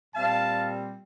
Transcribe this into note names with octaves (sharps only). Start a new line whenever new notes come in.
A#2 G3 C4 F5 A5